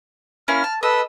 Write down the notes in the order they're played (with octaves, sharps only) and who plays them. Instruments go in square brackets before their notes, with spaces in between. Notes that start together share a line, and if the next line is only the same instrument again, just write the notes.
[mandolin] A#3 C#4 E4 [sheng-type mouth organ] F6
[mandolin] A5
[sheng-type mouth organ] A4 B4 E6 [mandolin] D#5